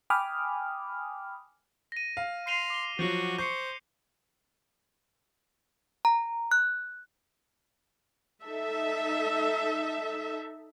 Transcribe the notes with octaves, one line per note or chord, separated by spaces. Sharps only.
G5 G#5 B5 D6 D#6 F6
A#6 D#7
F5
C6 C7 D#7 F7
D6 G7
F3 F#3 F#4
C5 C#6 G6 C7 C#7
A#5
F#6
D#4 A4 E5